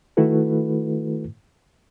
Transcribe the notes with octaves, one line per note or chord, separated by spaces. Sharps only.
D#3 A3 E4 F#4 A4 B4